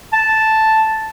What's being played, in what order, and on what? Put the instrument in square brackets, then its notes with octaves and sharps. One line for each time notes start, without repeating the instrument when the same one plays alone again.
[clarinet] A5